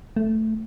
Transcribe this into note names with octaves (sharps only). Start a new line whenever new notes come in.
A3